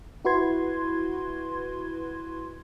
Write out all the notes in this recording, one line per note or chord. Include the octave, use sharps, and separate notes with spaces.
E4 F#4 B4 C6 G#6